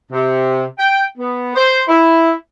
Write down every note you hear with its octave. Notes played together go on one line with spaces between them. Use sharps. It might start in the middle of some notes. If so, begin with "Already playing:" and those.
C3
G5
B3
C5
E4